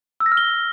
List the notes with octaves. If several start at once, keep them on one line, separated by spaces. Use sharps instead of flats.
E6
A#6
F6
G7